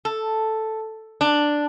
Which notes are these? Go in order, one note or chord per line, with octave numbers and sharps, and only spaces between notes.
A4
D4